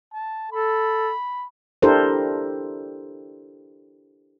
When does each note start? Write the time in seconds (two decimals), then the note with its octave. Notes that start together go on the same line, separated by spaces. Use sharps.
0.13 A5
0.52 A4 B5
1.82 D4 E4 G4 A4 A#4 C5